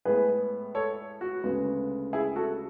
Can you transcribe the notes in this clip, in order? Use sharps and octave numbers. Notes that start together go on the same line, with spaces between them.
A2 G#3 B3 G#4 B4
A4 C#5
F#4
D2 C#3 G#3 B3
E4 G#4
F#4 A4